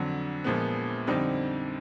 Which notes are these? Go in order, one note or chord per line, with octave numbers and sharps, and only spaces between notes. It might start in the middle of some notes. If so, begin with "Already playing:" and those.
Already playing: F2 D3 F#3
A#1 A#2 F3 G#3 B3
F2 D3 G3 C4 D#4